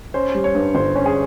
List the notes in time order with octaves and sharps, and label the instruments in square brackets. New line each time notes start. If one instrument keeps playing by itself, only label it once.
[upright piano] C#4 [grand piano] C5
[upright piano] G3
[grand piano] C#5
[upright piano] G2
[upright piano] G1 [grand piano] C5
[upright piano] C#4
[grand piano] G#4